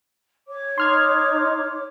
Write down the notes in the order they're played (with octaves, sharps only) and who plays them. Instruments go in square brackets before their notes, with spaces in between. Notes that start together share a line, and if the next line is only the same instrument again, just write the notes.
[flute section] C#5 D6
[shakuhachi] D#4 [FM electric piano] C6 F6 G#6